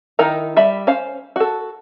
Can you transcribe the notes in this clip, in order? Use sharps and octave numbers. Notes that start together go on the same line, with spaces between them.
D#3 D#4 E4 A#4 A#5
G3 E5 B5
C#4 C5 F5
F#4 A4